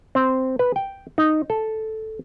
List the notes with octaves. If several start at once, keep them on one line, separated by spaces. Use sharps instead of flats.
C4
B4
G5
D#4
A4